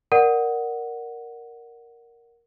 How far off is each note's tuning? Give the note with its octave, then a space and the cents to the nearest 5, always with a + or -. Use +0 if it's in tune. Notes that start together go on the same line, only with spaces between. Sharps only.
A#4 +0 D5 +0 F#5 +0